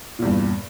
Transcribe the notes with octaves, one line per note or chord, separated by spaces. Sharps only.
E2 G2 A#2